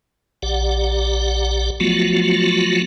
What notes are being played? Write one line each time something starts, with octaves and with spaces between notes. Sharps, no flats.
A#1 G4 D5 F#5
F3 F#3 A3 B3 F4 F#4